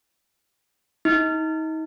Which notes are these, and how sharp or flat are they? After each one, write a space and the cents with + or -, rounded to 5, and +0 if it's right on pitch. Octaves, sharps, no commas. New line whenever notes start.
D#4 +35